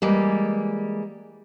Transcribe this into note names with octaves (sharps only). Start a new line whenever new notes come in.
E3 G3 G#3 A#3